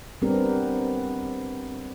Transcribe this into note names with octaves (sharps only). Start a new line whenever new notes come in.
G3 B3 C4 D4 G4 A#4